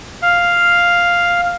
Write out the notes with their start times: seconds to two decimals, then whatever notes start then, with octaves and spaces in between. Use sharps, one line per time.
0.22 F5